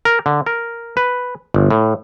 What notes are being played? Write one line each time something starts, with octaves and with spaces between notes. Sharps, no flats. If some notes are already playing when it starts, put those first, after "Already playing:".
A#4
D3
A#4
B4
G1
A2